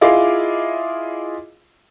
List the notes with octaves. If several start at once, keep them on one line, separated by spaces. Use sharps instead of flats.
E4 F4 G#4 D#5 F5 D6